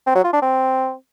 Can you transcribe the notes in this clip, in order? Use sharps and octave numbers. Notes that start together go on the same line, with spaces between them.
C4
F#3
F4
D4
C4